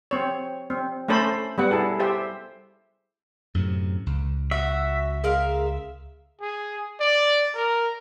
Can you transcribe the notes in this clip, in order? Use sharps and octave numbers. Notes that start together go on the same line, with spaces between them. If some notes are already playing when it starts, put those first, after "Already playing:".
C4 C#5
C4
A3 C#4 A4 C5 B5
G3 B3 F#5
E4 G#4 A4
G4 C5 E5
F#2 A2 C3
C#2
F#4 E5
G#3 A#4 F5
G#4
D5
A#4